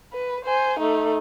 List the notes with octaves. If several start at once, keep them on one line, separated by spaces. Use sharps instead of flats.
B4
C5 G#5
A3 D#4